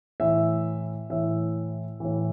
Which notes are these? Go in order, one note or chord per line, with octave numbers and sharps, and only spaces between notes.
A2 E3 E5
A2 E3 E5
A2 E3